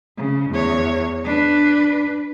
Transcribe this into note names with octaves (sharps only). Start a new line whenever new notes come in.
C#3
E2 C#5
D4 B4